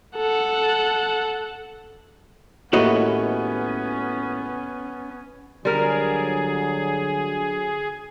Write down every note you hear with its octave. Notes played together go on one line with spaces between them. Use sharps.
A4 F#5
D#2 A2 B3 C#4 F#4 B4 D#5
D3 F#3 G3 G#4 A#4